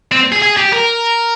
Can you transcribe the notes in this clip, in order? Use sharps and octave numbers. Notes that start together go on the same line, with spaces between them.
C4
G#4
G#4
G4
A#4